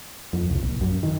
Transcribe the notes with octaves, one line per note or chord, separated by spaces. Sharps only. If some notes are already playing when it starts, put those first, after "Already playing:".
F2
C2
A#1
F#2
D#3